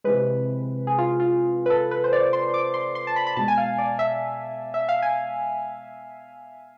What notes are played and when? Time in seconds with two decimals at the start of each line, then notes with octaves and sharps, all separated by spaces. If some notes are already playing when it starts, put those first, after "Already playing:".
0.04 C3 E3 G#3 B4
0.87 G#4
0.98 F4
1.20 F4
1.66 B4
1.70 A4
1.91 B4
2.04 C5
2.13 D5
2.33 C6
2.54 D6
2.74 C6
2.95 C6
3.07 A5
3.16 B5
3.27 B5
3.37 B2 G#3 A5
3.48 G#5
3.58 F5
3.78 D5
3.99 E5
4.74 E5
4.89 F5
5.02 G#5